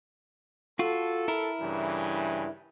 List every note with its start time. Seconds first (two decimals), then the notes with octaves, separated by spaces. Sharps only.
0.79 F4 F#4 A4
1.28 E4 A#4
1.61 G2 C#3 E3